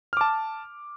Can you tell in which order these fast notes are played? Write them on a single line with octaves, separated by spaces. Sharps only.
F6 D6 A5